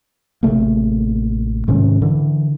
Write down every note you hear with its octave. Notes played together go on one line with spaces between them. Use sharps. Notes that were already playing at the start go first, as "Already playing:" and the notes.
A1 C3 A3 A#3
G#2 C3 D#3 C#4
D3 E3